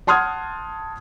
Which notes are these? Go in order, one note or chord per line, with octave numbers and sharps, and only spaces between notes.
F#5 A5 C6 D#6 F6 G#6